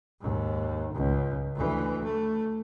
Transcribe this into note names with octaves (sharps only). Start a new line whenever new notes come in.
D#2 G#2
C#2
D2 E3
A3